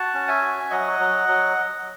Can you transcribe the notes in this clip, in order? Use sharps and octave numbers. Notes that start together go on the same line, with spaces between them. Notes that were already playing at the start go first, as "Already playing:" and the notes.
Already playing: F#4 F#5 A5
C#4
E5 G#5
F#4
F#3 D#5 F#5
F#3
F#3